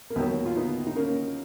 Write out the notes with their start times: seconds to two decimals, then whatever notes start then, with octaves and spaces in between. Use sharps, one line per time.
0.10 A#3
0.15 D#2 D#3 F#3 B3
0.45 F4
0.56 B3 D#4
0.87 D#4
0.96 A#3 C#4